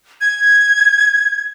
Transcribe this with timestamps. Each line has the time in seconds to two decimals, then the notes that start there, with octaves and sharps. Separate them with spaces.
0.21 G#6